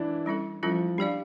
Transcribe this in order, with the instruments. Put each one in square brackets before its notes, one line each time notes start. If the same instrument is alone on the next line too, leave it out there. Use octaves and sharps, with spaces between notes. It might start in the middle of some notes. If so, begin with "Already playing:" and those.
Already playing: [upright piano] E3 D4 E4
[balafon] G3 C#4 E4 A4
[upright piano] F3 [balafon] G3 C#4 E4 A4
[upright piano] G3 [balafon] D4 G4 D5 F5